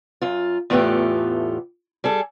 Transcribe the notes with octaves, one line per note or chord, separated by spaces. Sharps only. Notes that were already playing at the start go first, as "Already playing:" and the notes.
F#2 F4
E2 A2 A3 B3 F4 G4
G3 G#4 A4